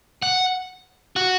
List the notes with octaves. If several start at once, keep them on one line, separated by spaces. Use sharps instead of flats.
F#5
F#4